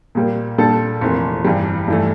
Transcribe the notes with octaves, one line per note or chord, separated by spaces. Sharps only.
A#2 G3 A#3
A#2 G3 D4 A4
F1 F2 E3 A#3
G2 E3 G3
G2 E3 A3